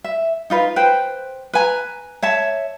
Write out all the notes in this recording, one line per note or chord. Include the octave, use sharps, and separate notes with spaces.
E5
D#4 F4 B4
B4 C5 G5
B4 G#5 A#5
C#5 E5 A5